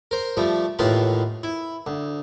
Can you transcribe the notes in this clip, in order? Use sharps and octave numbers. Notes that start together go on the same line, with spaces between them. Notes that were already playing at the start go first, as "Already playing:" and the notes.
A#4 C5
F3 G3 A3
D#2 A2 E3 F4 F#5 B5
E4
D2